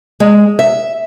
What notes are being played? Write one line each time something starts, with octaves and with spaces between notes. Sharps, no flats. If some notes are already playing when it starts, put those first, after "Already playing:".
G#3
E5